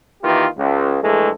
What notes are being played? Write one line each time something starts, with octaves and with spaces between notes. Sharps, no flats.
D#3 E3 A#3 F4 G4
C#2
A#1 E3 G#3 A3 A4